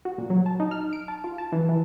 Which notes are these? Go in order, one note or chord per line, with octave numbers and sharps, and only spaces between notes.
F#4
A#2
F#3
A5
D#4
F6
D7
A5
F4
A5
E3
E3